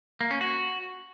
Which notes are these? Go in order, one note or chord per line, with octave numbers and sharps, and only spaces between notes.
A#3
C#4
F#4